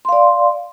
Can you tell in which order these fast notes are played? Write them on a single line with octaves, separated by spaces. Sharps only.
C6 F5 D5